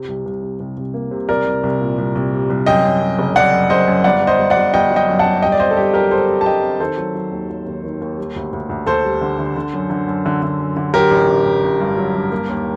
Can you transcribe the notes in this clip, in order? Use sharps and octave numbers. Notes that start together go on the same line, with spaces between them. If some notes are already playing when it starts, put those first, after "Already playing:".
Already playing: C3
C2
C2
C3
C2
C2
A#3
C3
C2 A#4 D5
C2
C2
A#2
C2
C2
G3
C2
F#2 D#5 G5
F#2
F#2
F#1
F#2 D5 F#5
F#2
F#1 C5 D#5
F#2
G1 D5 F#5
G1
C5 D#5
G1
D5 F#5
G1
G1 D#5 G5
F#3
D#5 G5
F#2
F#5 A5
G1
G2 D#5 G5
D5
C4 C5 D#5
A4
G2 G4
F#3 G4 A#4
G2 A4 C5
C4
A5
G2 D#5 G5
C4
D#3 A4 C5
F#3
F#3
D#2
F#3
D#2
D#3
D#2
G3
D2
D2
D2
D2 A4 C5
G3
D3
D3
D3
F#2
D3
F#2
D3
D3
F#2
D3
F#3 G4 A#4
A1
A1
A1
A1
G2
F#3
G2
A#3
D#2